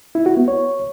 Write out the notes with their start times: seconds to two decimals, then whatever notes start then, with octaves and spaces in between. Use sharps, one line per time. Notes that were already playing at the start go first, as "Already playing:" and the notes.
0.15 E4
0.26 F#4
0.37 B3
0.48 C#5